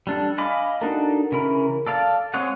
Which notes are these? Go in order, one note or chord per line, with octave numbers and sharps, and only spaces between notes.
G3 D4 A4
D#5 F5 G#5 B5 D6
D4 D#4 F#4 A4 A#4
C#3 E3 A#4 B5
A4 D5 F5 A5
G#3 C4 C#5 D#5 F#5